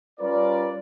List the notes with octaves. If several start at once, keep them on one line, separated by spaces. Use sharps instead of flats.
G3 C#4 F4 A#4 B4 D5